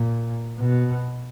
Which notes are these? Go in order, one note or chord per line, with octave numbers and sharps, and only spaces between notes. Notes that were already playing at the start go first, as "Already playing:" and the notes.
Already playing: A#2
B2